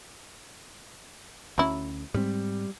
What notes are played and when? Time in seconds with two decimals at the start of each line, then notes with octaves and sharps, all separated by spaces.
1.58 D2 F#3 C#4 E4
2.14 G#2 G3 G#3 C4